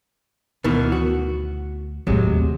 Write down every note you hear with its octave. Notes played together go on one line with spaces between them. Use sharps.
D2 B2 D#3 E3
F#4
D#2 A2 C3 F#3 G#3